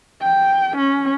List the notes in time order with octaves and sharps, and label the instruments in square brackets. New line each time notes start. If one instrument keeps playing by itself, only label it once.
[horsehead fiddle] G5
C#4